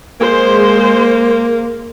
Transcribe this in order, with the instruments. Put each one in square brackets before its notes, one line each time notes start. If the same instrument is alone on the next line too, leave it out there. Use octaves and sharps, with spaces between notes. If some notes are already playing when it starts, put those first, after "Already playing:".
[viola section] G#3 C5 [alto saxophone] A#3